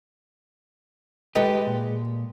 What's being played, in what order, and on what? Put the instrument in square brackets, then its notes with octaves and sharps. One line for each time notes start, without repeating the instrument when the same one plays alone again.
[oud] G#3 A4 B4 [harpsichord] D#4 [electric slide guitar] G4
[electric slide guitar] A#2